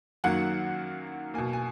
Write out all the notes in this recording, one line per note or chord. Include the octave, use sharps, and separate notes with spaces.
F#2 D#3 F#3 A#3 F#5
B2 A#3 G#5
G#5